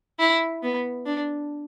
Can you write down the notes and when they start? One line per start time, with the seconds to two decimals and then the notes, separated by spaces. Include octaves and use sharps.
0.20 E4
0.63 B3
1.06 D4